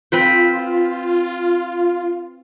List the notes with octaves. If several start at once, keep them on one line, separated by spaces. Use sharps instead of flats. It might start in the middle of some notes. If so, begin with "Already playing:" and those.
C4 F4 B4 C5